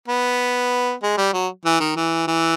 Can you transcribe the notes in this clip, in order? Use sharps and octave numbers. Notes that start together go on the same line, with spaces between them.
B3
G#3
G3
F#3
E3
D#3
E3
E3